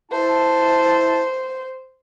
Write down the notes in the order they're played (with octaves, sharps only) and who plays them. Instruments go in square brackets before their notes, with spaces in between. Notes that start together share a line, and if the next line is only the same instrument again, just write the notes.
[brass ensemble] E4 E5 A5 [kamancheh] C5